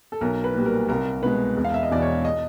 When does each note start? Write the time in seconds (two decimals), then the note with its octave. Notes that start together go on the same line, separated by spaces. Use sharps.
0.12 A4
0.21 B1 A#4
0.44 B4
0.54 A#2 G3
0.66 A#4
0.88 C2 A#4
1.22 B2 G#3 B4
1.56 E1
1.64 F5
1.74 E5
1.83 D#5
1.91 E2 B2 D5
2.02 C#5
2.25 D#5